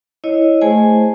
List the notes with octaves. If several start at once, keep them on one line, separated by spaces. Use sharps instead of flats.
E4 C#5 D#5
A3 G#4 C5 G#5